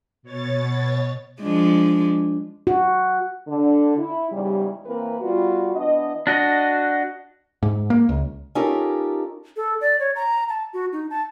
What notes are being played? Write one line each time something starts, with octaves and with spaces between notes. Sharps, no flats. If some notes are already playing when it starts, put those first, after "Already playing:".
B2 C#5 A6
F3 G#3 D4
F#4
D3
E4
E2 G#2 C#3 G3
E3 A#3 C4 A#4 B4
G3 B3 F4 F#4
E3 B3 D4 D#5
D4 F#4 D#5
G#2
A#3
C#2
C#4 D#4 F4 G4 A4 A#4
A4
D5
C#5
A#5
A5
F#4
D#4
A5